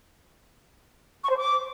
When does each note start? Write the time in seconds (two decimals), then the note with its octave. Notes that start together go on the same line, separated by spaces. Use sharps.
1.23 C#6
1.30 C5
1.37 D6